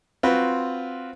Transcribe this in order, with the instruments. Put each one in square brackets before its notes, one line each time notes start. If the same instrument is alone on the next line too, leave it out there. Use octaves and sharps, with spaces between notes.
[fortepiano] C4 F4 F#4 B4